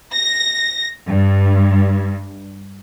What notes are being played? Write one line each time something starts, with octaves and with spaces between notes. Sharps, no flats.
A#6
G2